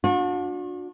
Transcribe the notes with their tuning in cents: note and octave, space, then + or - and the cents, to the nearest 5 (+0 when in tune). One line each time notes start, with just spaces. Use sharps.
D4 +0 F#4 -45